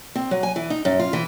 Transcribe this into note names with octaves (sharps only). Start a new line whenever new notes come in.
C4
F#3
G#5
E3
D#4
F#2
F4
E3